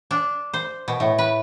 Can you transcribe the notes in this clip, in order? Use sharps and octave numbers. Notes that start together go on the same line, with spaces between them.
D4
C5
B2
A2
B4